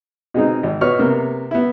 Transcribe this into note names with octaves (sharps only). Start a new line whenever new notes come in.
B2 G#3 C4 D#4
G#1
B2 F#4 B4 C#5 C#6 F6
C3 A#3 B3
B3 E4